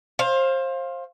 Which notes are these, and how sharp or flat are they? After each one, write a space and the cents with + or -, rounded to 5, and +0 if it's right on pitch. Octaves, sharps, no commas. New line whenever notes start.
C5 +25 F5 +0